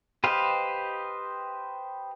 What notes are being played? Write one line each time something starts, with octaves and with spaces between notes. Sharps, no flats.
G4 B4 C5 D#5 F5